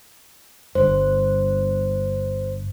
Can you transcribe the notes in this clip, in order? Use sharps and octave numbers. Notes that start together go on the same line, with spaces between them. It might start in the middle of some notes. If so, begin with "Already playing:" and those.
G1 G2 C5